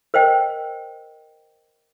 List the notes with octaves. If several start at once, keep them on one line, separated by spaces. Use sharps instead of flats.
A#4 C5 D#5 G5